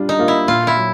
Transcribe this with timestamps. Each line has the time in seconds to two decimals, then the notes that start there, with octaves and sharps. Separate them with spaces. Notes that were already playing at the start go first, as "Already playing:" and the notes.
Already playing: G3 D4 F4
0.09 D#4
0.18 A#3 D4 F4
0.28 E4
0.48 A#2 F4
0.67 E4
0.77 F#3